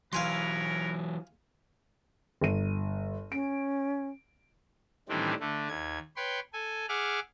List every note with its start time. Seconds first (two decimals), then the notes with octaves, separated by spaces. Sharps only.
0.13 E3 F#3 A#4 B4 C#5 F5 G#5 C6
2.41 G1 D#7
3.32 C#4 D7
5.09 A2 D#3 E3 G3 C4 D4
5.40 D3 A3
5.69 D#2 G#6
6.16 B4 C#5 G5 C6
6.53 A4 G#5
6.89 G#4 E5 F#5 D6 F6